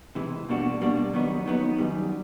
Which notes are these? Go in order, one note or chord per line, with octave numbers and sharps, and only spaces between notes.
C3 E3 G#3
B2 G3 A#3 D4 F#4
B2 G3 A#3 D4 F#4
D#3 F#3 B3 D#4
D#3 F#3 B3 D#4
F#2 D#3 G3